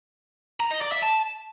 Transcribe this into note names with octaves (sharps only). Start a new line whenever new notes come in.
A#5
D#5
D5
E5
A5